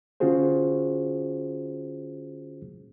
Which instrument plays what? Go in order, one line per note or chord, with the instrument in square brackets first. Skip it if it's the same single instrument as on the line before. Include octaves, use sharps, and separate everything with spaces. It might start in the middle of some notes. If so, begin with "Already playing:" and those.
[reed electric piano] D3 C#4 F4 F#4 G#4 C5